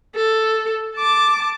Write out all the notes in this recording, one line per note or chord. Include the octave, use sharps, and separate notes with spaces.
A4
A5 D6